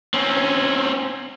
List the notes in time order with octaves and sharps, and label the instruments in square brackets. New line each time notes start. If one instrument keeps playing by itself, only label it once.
[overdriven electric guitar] C4 C#4